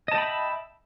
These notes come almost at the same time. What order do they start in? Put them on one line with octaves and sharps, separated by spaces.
D#5 A5 G5 B5 E5